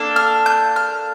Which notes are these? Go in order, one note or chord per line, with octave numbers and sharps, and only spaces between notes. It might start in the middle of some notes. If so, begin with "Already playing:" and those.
Already playing: A#3 D4 A4
F6
G6
F6